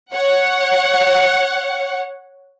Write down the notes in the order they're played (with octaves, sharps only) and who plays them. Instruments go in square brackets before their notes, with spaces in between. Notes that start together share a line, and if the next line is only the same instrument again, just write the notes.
[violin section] C#5 F#5